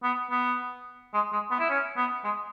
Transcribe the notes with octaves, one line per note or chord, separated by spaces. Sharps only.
B3
B3
G#3
G#3
B3
E4
C#4
B3
G#3